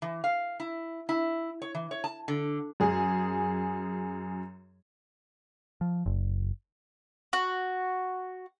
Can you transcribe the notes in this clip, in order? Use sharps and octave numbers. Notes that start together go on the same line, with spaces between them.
E3
F5
E4
E4
C#5
E3
C#5
A5
D3
F#2 G#4
F3
F#1
F#4